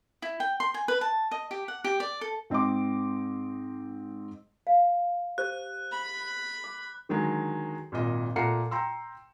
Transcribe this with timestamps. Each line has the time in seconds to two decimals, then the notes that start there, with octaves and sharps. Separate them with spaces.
0.22 E4
0.40 G5
0.60 C6
0.74 G#5
0.88 B4
1.01 A5
1.31 D#5
1.51 G4
1.68 F#5
1.84 G4
2.00 D5
2.21 A4
2.50 G#2 C4 D#5 C6 D6
4.67 F5
5.38 G4 C5 F#6
5.92 B5
6.64 D6
7.09 D3 D#3 F#3 G#3
7.92 G#1 A#2 D#5
8.36 A#2 A3 F#5 A#5 C7 C#7
8.71 G5 A#5 C6 E6